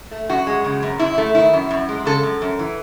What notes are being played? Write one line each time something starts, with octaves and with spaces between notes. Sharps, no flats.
A3
F#2 F#4
G#3
C#3
F#2
F#2 E4
A3
D#3 E4
F#2
F#2
G#3
C#3 A4
F#2
F#2
E3